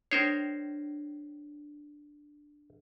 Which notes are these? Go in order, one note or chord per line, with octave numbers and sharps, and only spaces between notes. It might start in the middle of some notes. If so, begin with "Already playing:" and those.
D4 A#4 C5 C#5 C7